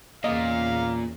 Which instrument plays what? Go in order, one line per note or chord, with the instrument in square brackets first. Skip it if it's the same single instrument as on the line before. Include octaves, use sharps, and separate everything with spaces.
[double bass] E2 C#3 [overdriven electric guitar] A#2 [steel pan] D#5 [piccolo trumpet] F5